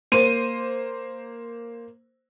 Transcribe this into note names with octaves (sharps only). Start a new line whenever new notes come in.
A#3 C5 D#7